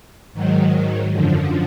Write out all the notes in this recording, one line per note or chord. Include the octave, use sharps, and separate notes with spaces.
G#2 D#3 F#3
F#2 D3 F3